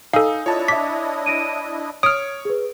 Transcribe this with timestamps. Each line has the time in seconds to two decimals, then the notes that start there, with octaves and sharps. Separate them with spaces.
0.13 D#4 A4 F5 G#5 D#6
0.46 D4 E4 F4 C#5 D#5 A5
0.68 E5 D6 B6
1.26 A#6 D7 D#7
2.03 C#5 D#6 F6 D7
2.45 G#4 B4